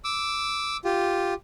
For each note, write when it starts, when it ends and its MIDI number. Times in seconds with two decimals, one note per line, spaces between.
0.04 0.77 86
0.04 0.77 88
0.84 1.34 65
0.84 1.34 67